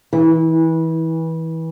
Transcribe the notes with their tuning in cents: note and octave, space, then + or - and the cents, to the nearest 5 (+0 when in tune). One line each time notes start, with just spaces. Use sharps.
E3 -25